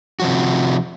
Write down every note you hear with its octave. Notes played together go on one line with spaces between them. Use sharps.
C3 F3 F#4